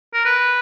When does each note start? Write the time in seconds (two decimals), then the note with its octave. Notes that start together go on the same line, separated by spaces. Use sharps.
0.14 A#4
0.25 B4